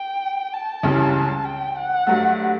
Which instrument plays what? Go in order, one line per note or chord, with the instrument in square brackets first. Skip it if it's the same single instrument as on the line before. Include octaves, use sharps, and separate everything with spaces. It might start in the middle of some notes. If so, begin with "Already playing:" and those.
Already playing: [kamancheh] G5
A5
[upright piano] C#2 C#3 E3 G3 C#4
[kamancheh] G5
F#5
[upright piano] G2 F#3 A3